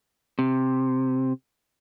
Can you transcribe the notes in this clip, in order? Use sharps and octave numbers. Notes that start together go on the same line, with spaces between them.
C3